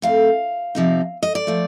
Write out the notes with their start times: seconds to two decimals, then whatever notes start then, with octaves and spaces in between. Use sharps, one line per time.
0.02 A2 A3 C4 F5
0.75 C3 F3 C4 D#4
1.23 D#5
1.35 D5
1.47 F3 A3